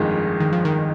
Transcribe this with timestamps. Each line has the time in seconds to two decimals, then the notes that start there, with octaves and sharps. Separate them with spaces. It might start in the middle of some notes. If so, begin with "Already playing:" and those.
Already playing: G1 F2 D#3 G#3 D#4
0.40 D#3
0.53 F3
0.65 D#3